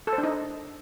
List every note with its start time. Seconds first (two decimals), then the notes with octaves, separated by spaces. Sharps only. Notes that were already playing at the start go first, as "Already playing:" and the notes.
0.07 A4
0.13 C5
0.18 D4
0.24 D#4